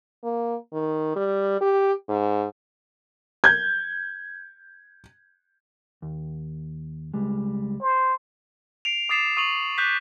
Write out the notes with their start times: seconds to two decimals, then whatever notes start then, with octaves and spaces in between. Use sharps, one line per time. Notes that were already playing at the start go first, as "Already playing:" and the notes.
0.24 A#3
0.73 D#3
1.16 G3
1.61 G4
2.08 G#2
3.44 G6 G#6
6.02 D#2
7.14 C#2 G3 G#3
7.82 C5
8.85 C7 D7 F7
9.09 D6 D#6 A6 C7 E7
9.37 C#6 D#6 D#7 F7 F#7
9.78 D6 F#6 G6 B6